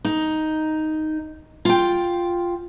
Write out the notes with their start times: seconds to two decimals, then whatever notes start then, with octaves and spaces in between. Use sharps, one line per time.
0.05 D#4
1.65 F4 G5